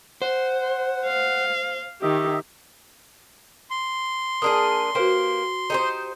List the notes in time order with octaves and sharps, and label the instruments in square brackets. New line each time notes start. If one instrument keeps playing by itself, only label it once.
[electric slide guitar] C5 [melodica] F#5
[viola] F5
[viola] D#3 G4 [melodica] D#5 E5
[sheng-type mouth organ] C6
[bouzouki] A#3 D4 G#4 [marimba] D#6
[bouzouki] A#3 G4 C5 [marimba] F#4 B4
[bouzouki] D#4 G4 C5